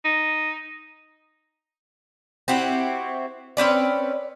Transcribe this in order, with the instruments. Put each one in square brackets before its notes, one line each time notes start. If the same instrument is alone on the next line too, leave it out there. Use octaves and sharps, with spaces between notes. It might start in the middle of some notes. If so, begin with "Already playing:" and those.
[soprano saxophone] D#4
[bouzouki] C4 E4 F#4 G4
C4 C#4 B4 D5